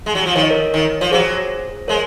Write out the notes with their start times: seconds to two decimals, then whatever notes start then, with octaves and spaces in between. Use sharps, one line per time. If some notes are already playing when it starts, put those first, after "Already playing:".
0.06 G#3
0.15 F#3
0.26 F3
0.35 D#3 C#5
0.43 D#5
0.50 A#4 C#5
0.74 D#3
1.01 F3 C#5
1.12 F#3 G#4 C5
1.88 G#3 A#4 C#5